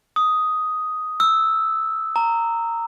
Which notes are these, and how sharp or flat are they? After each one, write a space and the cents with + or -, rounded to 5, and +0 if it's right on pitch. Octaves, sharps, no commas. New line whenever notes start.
D#6 +5
E6 -5
A#5 -15